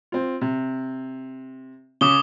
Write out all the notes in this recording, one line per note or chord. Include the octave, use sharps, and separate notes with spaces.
C4 F4
C3
C#3 C#4 D6 D#6 G7